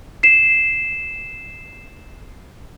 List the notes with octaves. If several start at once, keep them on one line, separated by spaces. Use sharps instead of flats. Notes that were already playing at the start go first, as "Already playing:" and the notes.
C7 E7